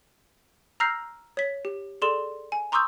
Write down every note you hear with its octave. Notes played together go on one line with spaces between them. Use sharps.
A#5 E6 F6 G6 A#6 C7
C#5 B6
G4
G#4 A4 D5 C6 E7
G#5
A#5 C6 C#6 D#6 E6 G6